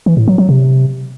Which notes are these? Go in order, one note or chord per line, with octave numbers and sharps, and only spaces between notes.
E3
A2
F#3
F#3
C3